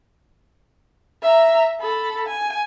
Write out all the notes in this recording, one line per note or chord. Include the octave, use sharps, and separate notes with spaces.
E5 A#5
A4 B5
G#5